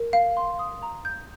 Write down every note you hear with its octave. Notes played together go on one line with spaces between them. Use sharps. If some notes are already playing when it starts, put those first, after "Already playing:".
Already playing: A#4
F5
C6
D#6
A#5
G6